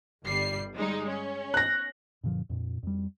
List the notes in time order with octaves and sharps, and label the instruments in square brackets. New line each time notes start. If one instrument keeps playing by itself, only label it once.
[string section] G1 G3 C7
G3 G#3 D#4
C#4
[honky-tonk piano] F#6 A#6
[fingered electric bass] F#2 A#2 D3 F3
F2 A#2
F2 G3